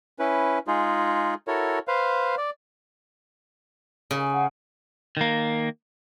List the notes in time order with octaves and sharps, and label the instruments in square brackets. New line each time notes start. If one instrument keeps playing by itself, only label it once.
[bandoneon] C#4 E4 B4
G#3 D#4 F4 G#4
E4 F#4 A4 A#4 C#5
B4 C5 F5
D5
[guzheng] C#3
[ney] F#5
[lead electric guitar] D#3 A#3